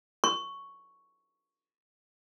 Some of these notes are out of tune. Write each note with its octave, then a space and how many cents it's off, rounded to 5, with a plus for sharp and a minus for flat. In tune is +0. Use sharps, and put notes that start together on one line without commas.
C#6 +0